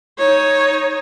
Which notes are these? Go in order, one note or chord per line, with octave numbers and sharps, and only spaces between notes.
D#4 C#5